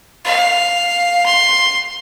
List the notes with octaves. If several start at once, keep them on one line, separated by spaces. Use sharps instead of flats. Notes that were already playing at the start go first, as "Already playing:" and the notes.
F5
C6